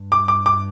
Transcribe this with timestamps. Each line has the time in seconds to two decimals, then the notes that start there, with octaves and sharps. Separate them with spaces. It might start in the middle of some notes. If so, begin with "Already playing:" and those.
Already playing: G2
0.12 D6
0.28 D6
0.46 D6